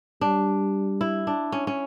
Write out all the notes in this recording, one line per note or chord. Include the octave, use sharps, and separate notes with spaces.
G3 D4
E4
D4
C#4
C#4